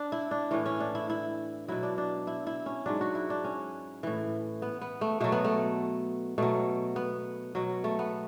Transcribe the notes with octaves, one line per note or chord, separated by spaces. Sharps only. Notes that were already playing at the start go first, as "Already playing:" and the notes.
Already playing: D4
E4
D4
A2 E3 C#4
C#4
D4
E4
E4
B2 F#3 E4
D4
D4
E4
E4
C#4
G#2 F#3 D4
F#4
E4
D4
C#4
A2 E3
B3
B3
A3
B2 F#3 A3
B3
A3
B2 F#3 A3
B3
B2 F#3
A3
B3